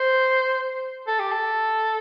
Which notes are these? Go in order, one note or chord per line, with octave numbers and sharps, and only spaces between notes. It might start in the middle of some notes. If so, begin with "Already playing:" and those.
Already playing: C5
A4
G4
A4